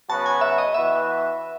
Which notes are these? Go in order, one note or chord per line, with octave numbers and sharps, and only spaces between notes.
C#3 F#3 B3 F#4 B4 A5
G#5
E5
D#5
E3 B3 F#4 B4 E5